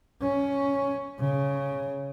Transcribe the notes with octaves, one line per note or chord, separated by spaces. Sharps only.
C#4
C#3